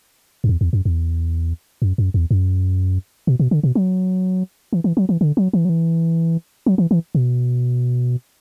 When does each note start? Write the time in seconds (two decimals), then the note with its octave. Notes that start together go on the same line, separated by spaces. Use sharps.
0.44 F#2
0.49 E2
0.61 E2
0.73 F#2
0.85 E2
1.82 F#2
1.98 F#2
2.14 E2
2.31 F#2
3.27 B2
3.40 B2
3.51 D3
3.63 B2
3.75 F#3
4.73 E3
4.84 E3
4.97 F#3
5.09 E3
5.21 D3
5.37 F#3
5.53 E3
5.65 F#3
5.69 E3
6.66 F#3
6.78 E3
6.91 E3
7.15 B2